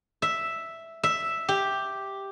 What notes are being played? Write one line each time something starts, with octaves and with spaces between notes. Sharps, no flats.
E5
E5
G4